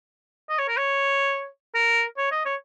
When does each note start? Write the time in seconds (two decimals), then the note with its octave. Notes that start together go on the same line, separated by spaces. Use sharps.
0.49 D#5
0.58 C#5
0.68 A#4
0.77 C#5
1.75 A#4
2.17 C#5
2.32 D#5
2.45 C#5